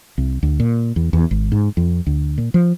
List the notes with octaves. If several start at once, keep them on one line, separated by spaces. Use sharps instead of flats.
C2
D2
A#2
E2
E2
G#1
G#2
F2
D2
A#2
F3